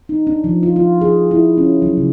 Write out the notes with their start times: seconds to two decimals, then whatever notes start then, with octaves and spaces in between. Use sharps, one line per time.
0.09 D#4
0.27 D4
0.44 F3
0.63 F4
0.76 F4
1.01 G#4
1.31 E4
1.58 C#4
1.82 F#3
1.97 C#3